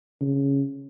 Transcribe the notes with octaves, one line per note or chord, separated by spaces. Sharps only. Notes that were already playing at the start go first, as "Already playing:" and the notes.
C#3